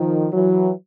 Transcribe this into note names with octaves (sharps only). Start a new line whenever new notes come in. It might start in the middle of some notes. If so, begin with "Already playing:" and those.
Already playing: D#3 F3
E3 F#3